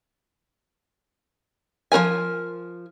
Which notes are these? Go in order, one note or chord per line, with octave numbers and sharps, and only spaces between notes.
F3 D#4 A#4 G#5